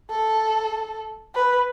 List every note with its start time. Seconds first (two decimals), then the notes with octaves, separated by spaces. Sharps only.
0.11 A4
1.35 B4